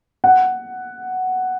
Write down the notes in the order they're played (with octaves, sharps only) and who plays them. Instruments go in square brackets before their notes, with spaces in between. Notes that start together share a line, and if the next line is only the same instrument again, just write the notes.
[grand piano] F#5